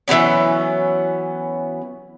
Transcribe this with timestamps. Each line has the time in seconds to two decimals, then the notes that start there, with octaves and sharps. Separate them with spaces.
0.08 E3 F#3 B3 C#4